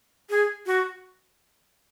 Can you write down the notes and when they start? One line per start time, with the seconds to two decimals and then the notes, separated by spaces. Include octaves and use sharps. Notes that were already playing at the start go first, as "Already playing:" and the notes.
0.30 G#4
0.66 F#4